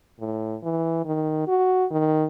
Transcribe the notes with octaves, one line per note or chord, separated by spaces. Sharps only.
A2
E3
D#3
F#4
D#3